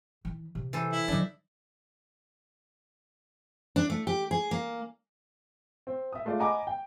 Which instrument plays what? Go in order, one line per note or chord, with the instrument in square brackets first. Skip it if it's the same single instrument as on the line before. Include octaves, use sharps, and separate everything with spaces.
[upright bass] E3
C3
[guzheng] E3 A4 C5
[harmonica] E4
[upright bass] D3 F#3 [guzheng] D4 D#4
[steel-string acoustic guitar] D4
A3
G4
G#4
A#3
[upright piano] C4
E5 D#6
G#3 A3 F4 D5
D#5 F#5 G#5 A#5 B5 D6
G5